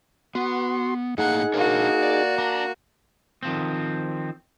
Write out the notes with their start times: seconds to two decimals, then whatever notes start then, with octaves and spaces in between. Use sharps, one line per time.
0.35 B3 F#4 C6
1.18 A2 A#3 D#4 G#4 F#5 A#5
1.54 A#3 D4 F#4 A#4 C#5
2.03 D5
2.38 D4 A#5
3.43 D#3 F3 C4